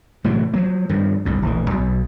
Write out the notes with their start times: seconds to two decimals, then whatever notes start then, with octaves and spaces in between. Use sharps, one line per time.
0.24 A2 C3 E3 F#3
0.54 F3 F#3 A#3
0.89 G2 D#3 F3
1.25 G1 C2 F2
1.42 D1 A#1 D3 E3
1.70 B1 B2